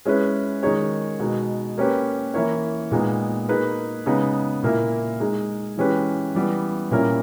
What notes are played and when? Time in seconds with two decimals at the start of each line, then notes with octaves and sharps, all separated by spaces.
0.05 G#3 C#4 E4 G#4 B4
0.63 D#3 G#3 D#4 G#4 C#5
1.20 B2 G#3 D#4
1.78 A#3 C#4 G4 B4
2.34 E3 A#3 E4 A#4 C#5
2.91 A#2 G#3 B3 D#4
3.48 A#3 D#4 G#4 B4
4.06 C#3 G#3 B3 D#4
4.63 A#2 A#3 E4 A#4
5.20 G#3 D#4 G#4
5.77 E3 G#3 C#4 G4 B4
6.35 E3 G3 B3
6.91 A#2 G3 C#4 E4 A#4